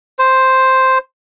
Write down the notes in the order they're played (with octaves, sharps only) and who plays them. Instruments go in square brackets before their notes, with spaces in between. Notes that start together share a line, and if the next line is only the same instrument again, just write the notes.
[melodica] C5